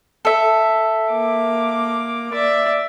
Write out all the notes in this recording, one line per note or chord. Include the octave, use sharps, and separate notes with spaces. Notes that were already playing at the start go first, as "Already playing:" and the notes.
A4 E5
A#3 D6
D5 E5